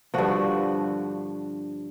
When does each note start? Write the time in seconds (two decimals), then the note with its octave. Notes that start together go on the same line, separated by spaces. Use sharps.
0.14 G2 D3 F3 F#4